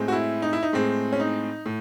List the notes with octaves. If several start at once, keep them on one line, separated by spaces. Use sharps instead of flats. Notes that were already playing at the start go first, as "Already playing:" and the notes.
Already playing: A2 G#3 C4
F#4
E4
D#4
E4
D#4
A2 G#3 C4
C#4
D#4
A2